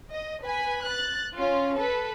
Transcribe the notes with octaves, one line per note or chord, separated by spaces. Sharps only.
D#5
B4 G#5 B6
F#6 A6
C#4 F4
A4 B4